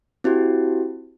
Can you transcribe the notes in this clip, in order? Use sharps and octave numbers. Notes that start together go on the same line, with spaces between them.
C4 E4 F#4 G4